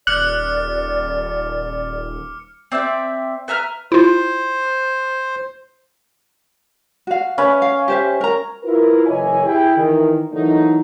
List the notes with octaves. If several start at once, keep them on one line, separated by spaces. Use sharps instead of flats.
D#1 D5 D6 F6 F#6 C#7
C4 D5 E5 G5
B4 E5 A#5 F6
E4 F4 C5
F#4 F5
C#4 B4 E5 B5
F5
G4 C5 E5
A#4 A#5
E4 F4 A#4 B4
F#1 E3 C#5 D#5 G#5
E4 G4 G#4 G5
D#3 E3
E3 F#3 A3 A#3 D#4